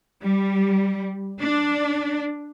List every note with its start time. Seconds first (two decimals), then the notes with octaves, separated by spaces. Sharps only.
0.21 G3
1.40 D4